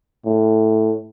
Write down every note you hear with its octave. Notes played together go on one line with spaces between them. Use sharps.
A2